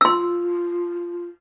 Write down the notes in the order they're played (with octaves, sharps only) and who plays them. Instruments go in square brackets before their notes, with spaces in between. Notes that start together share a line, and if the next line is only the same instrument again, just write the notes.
[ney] F4 [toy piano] C6 E6